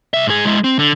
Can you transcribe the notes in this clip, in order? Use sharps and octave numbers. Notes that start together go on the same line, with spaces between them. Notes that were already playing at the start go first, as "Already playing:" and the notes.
C2 E5
G#2 G#4
G#3 E4
C4
D3